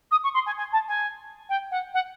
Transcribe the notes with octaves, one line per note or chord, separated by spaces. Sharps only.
D#6
C#6
C6
G#5
G#5
A5
G#5
G5
F#5
F#5